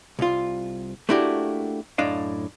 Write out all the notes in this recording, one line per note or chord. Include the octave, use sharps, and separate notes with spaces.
C2 F4
A3 A#3 D4 E4 F#4 G4
F#2 A2 D4 D#5 F5